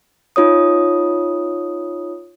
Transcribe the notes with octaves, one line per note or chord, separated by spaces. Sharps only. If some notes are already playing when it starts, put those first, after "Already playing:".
D#4 F4 C#5 D#6